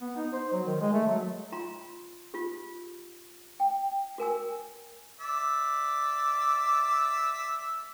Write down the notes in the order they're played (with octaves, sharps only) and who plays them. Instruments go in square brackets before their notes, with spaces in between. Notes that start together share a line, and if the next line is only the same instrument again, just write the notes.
[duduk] B3
D#4
C5
F#3
D#3
G#3
A3
F#3
[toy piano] F4 A#5 C6
F4 G4
G5
F#4 A#4 G#5 E6
[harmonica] D5 E5